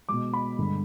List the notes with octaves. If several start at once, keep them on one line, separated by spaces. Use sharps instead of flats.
B2 G#3 D6
B5
G2 D3 G#3